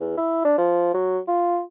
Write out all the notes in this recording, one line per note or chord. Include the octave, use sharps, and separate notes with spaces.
E2
E4
D4
F3
F#3
F4